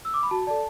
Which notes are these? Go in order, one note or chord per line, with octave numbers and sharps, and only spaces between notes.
E6
D6
B5
F#4 A5
A4 D5 A5